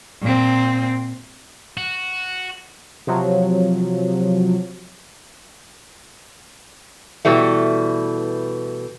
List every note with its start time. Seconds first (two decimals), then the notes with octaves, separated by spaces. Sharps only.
0.23 A#2 C4
1.77 F#4
3.07 C3 F3 F#3
7.25 B2 E3 G3 A3